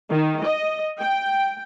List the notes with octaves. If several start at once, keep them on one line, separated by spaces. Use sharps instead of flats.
D#3
D#5
G5